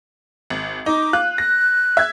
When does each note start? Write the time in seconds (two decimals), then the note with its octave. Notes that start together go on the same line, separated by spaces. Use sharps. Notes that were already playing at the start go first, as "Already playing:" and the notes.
0.50 G#1
0.86 D#4 D6
1.13 F4 F#6
1.38 F#6 A#6
1.97 E5 G#6